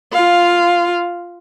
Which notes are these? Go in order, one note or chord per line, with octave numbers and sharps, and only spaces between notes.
F4 F5